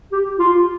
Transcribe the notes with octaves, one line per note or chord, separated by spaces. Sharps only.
G4
F4